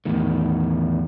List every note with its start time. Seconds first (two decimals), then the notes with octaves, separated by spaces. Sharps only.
0.05 E2 A2 D#3